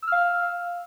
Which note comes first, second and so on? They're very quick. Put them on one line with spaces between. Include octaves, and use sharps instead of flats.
E6 F6 F5